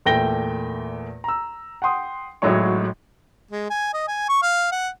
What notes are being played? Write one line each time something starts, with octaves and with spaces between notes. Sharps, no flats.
E2 A#2 A3 G5 A#6 G7
A#5 E6
F#5 G5 C6 D#6
G#1 A2 F#3 G#3 C#5 C#6
G#3
G#5
D#5
G#5
C#6
F5
F#5